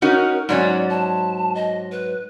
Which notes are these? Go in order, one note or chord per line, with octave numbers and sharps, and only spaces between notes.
C#4 D#4 F#4 A#4
G#2 F#3 C#4 D5
A5
D#5
B4